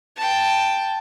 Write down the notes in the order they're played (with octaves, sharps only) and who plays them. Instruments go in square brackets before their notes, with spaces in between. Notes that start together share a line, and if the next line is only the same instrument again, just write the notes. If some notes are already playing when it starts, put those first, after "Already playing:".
[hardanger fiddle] G5 A5